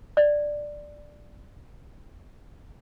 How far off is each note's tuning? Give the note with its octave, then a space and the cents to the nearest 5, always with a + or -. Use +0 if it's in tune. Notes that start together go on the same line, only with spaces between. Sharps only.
D5 +5